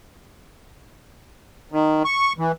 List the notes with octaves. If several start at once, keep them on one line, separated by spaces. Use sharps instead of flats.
D#3
C#6
E3